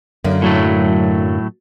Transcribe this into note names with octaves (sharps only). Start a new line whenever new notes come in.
F#2 D3 A#3
A2 F#3 A3